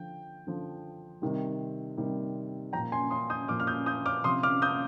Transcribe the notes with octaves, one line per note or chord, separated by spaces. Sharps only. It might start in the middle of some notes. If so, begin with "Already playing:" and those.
Already playing: D3 F3 G5
D3 F3
C3 D#3 G3
C3 D#3 G3
A#2 F3 G5 A#5
G#5 C6
C6 D#6
D#6 G6
A#2 F3 D6 F6
F6
D#6 G6
D#6 G6
D6 F6
C3 F3 C6 D#6
D6 F6
D#6 G6